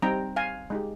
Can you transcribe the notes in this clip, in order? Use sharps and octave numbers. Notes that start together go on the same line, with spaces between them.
G3 C4 D#4 G5 A#5
F5 G#5
G#3 D#4 G4